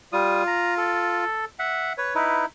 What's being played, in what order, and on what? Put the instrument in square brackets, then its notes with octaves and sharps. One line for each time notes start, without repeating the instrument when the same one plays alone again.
[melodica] G3 D#6 [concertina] F4
[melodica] A#5
A4
E5 F#5
[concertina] B4 C#5
[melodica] D#4 E4 [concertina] B4